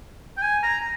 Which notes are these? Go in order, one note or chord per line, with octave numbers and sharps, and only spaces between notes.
G5
G#5
A#5